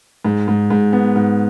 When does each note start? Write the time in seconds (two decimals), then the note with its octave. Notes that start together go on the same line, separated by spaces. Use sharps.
0.25 G#2
0.48 G#2
0.70 G#2
0.93 B3
1.16 G#2